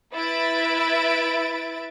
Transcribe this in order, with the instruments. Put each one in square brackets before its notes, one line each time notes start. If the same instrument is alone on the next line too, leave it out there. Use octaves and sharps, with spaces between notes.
[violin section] E4 B4 E5 A6 D7